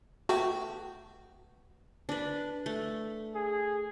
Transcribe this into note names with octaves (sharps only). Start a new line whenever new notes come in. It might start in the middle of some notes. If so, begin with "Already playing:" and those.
A3 B3 F#4 G4
D4 B4
A3
G#4